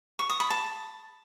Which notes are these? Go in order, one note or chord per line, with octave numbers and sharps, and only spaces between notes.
C#6
D#6
B5
A5